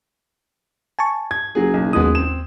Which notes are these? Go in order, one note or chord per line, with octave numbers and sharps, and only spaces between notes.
G#5 A5 C#6
G#6
F#1 F#3 G#4
B1
D#2 F3 G#3 B3 D#6
C4 E7